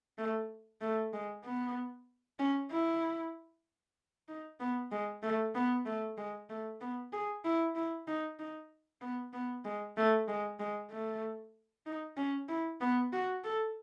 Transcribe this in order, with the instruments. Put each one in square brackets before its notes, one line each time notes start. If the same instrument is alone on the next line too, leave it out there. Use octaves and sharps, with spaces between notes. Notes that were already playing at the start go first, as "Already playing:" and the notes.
[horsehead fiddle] A3
A3
G#3
B3
C#4
E4
D#4
B3
G#3
A3
B3
A3
G#3
A3
B3
G#4
E4
E4
D#4
D#4
B3
B3
G#3
A3
G#3
G#3
A3
D#4
C#4
E4
B3
F#4
A4